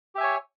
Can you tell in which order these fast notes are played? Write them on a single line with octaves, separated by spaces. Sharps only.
G4 E5 G#5 C#5